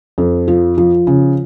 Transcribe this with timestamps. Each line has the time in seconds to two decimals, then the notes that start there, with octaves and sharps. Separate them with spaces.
0.18 F2
0.48 F3
0.78 F3
1.07 C#3